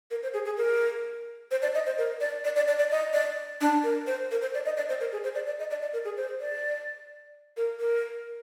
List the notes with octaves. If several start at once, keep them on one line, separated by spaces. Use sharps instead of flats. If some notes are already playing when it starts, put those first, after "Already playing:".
A#4
C5
G#4
G#4
A#4
C5
D5
D#5
C5
A#4
D5
D5
D5
D5
D5
D#5
D5
D4
A#4
C5
A#4
C5
D5
D#5
D5
C5
A#4
G#4
C5
D5
D5
D#5
D5
D5
A#4
G#4
C5
D5
A#4
A#4